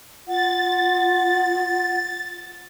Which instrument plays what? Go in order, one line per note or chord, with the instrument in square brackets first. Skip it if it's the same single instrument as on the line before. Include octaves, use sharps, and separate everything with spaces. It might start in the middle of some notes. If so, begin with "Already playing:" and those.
[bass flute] F4 [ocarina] F#5 [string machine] A6